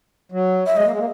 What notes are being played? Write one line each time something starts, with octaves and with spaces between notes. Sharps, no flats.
F#3
E5
G#3 D#5
A#3
G#3
A#3